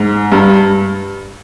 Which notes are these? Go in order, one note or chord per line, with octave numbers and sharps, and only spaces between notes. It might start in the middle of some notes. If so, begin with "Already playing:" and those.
Already playing: G#2
G2